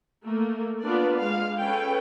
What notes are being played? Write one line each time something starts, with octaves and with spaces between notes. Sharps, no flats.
A3 A#3
A#3 B3 D4 F4 B4 D5
G#3 F5
C#4 A4 B4 G5